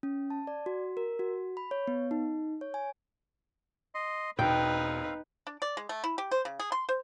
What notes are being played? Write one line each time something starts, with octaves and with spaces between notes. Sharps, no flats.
C#4
A5
D5
F#4
A#4
F#4
B5
C#5
B3
D#4
C#5
G#5
D#5 C6
E1 B2 C4 D#4 B4 F5 G5
D4
D5
G#3
A3
E4
G4
C5
C#3
G#4
C6
C5